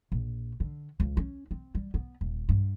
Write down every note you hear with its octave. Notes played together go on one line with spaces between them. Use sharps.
A#1
D3
C#2
C#4
C4
G3
B3
D#1
G2